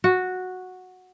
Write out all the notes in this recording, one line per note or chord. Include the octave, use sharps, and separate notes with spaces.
F#4